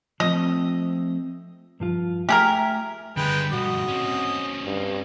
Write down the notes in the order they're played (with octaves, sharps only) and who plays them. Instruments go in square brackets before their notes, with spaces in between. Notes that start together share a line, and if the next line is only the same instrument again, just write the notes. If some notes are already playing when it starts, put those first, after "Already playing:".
[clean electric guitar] F3 A3 C4 [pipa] D#5
[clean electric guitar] G2 F3 F4
[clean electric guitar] A3 E5 [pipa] G4 G#4 A#4
[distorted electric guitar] D3 G3 [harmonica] G#3 B4 G5
[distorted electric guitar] G2 B2 [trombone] F#4 [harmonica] D#5
[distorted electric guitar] C4 C#4
[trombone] G2